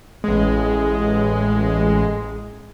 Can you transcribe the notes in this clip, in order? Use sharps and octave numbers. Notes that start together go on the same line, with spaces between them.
A1 G#3